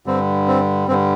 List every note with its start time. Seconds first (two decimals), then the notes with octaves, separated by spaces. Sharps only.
0.06 G2 D3 G3 C4
0.48 C4
0.88 G2 D3 G3 C4